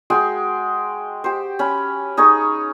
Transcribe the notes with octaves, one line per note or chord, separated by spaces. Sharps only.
G#3 F#4 G5 C6
G4 C5
C#4 B5
D#4 G#4 C#5 C#6